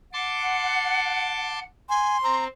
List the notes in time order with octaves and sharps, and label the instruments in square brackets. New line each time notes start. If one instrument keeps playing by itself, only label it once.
[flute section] F#5 [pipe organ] A5 C6 D6
[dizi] G#5 [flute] C6
[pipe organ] C4 [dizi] A#5